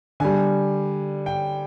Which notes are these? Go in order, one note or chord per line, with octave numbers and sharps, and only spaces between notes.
D3 G3 G#5
G5